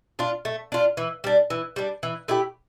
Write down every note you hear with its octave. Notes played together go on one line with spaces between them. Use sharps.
D4 F4
A3
D4 F4
E3
G3 D4
E3
G3 D4
E3
A3 E4 G4